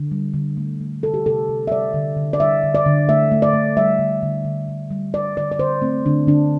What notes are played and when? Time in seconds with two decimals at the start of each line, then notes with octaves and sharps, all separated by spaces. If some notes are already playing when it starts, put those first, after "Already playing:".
Already playing: D3
0.11 G3
0.34 D3
0.57 A3
0.80 A3
1.03 C3 A4
1.14 G4
1.26 C3 A4
1.49 C3
1.67 E5
1.71 G3 D5
1.94 D3
2.17 D3
2.33 D5
2.40 G3 E5
2.63 D3
2.75 D5
2.86 D3
3.08 A3 E5
3.31 A3
3.42 D5
3.54 A3
3.77 G3 E5
3.99 D3
4.23 D3
4.45 D3
4.69 D3
4.91 G3
5.14 G3 D5
5.37 D3 D5
5.52 D5
5.59 D3 C5
5.82 A3 C4
6.06 D3 D4
6.27 D3 D4